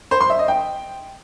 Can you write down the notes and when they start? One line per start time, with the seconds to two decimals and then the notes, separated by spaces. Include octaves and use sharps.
0.11 C5
0.20 C6
0.30 E5
0.39 D#5
0.48 G5